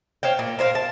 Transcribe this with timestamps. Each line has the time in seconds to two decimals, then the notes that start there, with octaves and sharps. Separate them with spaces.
0.23 C5 C#5 F5 G5
0.39 A#2
0.59 A#4 C5 C#5 F5
0.75 A5